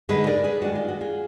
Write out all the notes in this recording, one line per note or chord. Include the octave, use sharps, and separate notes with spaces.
D3 G#3 D#4 G#4 B4
A#4 D5
G#4 B4
D#3 G#3 D4 F#4
F4
F#4
F4 G#4